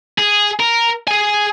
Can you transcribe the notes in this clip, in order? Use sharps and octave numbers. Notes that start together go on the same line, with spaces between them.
G#4
A#4
G#4 G#5